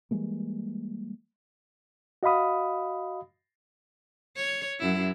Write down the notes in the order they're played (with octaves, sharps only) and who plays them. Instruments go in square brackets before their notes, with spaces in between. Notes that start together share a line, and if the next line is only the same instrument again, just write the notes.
[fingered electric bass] E3 G3 G#3 A#3
[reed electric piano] F#4 D#5 F5 B5 D#6
[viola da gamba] C#5
F#2 E4